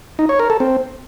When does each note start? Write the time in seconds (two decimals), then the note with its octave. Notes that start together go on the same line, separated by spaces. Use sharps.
0.19 D#4
0.29 C#5
0.39 A#4
0.50 A4
0.60 C4